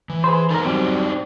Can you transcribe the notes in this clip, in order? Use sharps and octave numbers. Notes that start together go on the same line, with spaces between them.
E3
G#4 B4 C5
D4 D#4 A4 A#4 C5
F#3 G3 C4